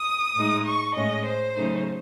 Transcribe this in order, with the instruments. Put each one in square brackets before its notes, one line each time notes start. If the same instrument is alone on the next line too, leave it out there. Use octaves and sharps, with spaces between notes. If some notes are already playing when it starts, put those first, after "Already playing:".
Already playing: [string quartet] D#6
A2 G#3 D#4
C#6
A2 G#3 C#4 D#5
C5
C#3 F#3 A3 D#4